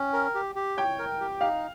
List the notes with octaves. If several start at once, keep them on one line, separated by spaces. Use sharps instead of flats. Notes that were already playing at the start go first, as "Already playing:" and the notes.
Already playing: C#4 G5
A#4
G4
G4
C#5 G5
A#4
G4
D#4 F5